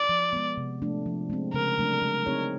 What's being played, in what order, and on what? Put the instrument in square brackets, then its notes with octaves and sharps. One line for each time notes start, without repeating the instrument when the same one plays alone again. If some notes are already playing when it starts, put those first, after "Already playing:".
Already playing: [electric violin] D5
[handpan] F3
G#3 B3
C3
F3 A3 D4
F3
G#3 C4
[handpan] C#3 [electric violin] A#4
[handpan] F#3 A3 D4
G#3
C4 D#4 G#4 C#5